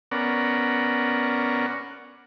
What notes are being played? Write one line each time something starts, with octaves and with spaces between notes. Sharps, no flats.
B3 C#4 A#4 D5 F#5